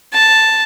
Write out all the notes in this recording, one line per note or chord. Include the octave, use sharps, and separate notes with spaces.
A5